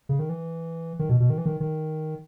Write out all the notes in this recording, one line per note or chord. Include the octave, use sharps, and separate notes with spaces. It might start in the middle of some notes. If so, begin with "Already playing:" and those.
C#3
D#3
E3
D#3
B2
B2
D#3
E3
D#3
D#3